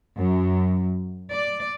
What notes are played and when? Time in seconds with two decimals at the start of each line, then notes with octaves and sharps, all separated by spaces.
0.16 F#2
1.31 D5